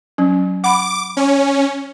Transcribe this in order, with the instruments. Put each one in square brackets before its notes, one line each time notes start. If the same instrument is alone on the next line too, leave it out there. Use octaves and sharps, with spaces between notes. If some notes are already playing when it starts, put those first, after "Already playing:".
[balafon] F#3 C#4
[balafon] F#5 B5 [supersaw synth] D6
[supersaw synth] C#4